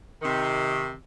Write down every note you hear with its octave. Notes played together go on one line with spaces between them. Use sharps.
C3 D#3